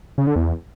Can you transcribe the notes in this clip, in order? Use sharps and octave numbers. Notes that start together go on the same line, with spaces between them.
C#3
D3
E2